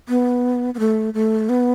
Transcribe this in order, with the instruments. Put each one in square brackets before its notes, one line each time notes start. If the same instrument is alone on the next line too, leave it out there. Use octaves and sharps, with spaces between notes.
[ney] B3
B3
A3
A3
B3